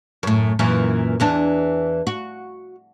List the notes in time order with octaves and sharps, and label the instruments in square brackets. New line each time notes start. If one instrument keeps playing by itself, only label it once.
[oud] F#2 A2
F#2 A#2 E3
E2 E3 D4
F#4